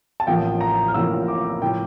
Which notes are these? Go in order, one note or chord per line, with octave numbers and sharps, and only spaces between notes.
A5
A1 A2 F3 A#3 G5
A#5
F6
A1 A2 F3 A#3 E6
D6
A2 F3 G5